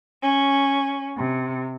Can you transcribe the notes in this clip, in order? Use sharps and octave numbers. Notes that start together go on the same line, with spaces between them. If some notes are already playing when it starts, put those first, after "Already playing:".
C#4
C3